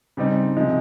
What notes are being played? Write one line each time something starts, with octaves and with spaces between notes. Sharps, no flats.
C#3 G3 C4 D#4
C3 F3 G#3